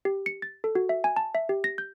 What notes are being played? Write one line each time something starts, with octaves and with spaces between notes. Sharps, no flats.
G4
C#7
A6
A4
F#4
E5
G#5
A5
E5
G4
A#6
G6